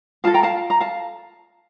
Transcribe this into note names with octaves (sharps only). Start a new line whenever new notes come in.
F4 A4 F5 A5
G5 A#5
F5 A5
A#5
F5 A5